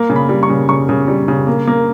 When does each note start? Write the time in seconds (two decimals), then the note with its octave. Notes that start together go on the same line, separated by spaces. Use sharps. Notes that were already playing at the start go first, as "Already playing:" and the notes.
Already playing: A#3
0.10 C#3
0.16 B5
0.29 G3
0.43 C#6
0.49 C#3
0.69 C#3 C#6
0.89 C#3
1.08 G3
1.28 C#3
1.47 A#3
1.67 A#3